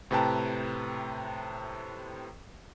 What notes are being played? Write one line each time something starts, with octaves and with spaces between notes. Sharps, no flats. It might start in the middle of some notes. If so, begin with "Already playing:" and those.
A2 C3 B4 G5 A5 A#5